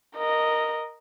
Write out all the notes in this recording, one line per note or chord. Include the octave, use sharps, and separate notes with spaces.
A#4 D#5